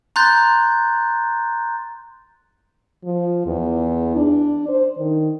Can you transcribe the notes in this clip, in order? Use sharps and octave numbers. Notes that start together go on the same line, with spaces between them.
A#5 C6 F#6 G6 A6
F3
E2
D4
C5
D#3